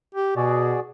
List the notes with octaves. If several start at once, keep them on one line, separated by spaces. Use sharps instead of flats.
G4
B2 F#4 G#4 D5